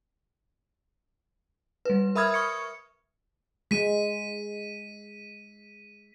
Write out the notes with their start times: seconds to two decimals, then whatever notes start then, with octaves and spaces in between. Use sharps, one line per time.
1.85 G3 B4
2.15 A#4 E5 B5 D#6 F6 G#6
2.34 C#6 C#7
3.71 G#3 B6 D#7